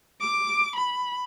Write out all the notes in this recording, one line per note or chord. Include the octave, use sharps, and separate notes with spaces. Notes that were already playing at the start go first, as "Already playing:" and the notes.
D6
B5